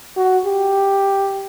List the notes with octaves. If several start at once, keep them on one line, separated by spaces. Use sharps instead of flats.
F#4
G4